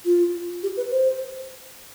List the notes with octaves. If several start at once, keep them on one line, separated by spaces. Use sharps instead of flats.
F4
G4
B4
C5